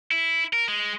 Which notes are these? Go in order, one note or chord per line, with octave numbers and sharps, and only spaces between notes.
E4
A#4
G#3